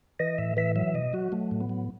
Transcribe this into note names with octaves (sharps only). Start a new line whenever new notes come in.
E3 D#5
A2 E5
E3 E5
F#3 E5
B2 D#5
F#3 F#4
F#3 A3
A2
B3
F#3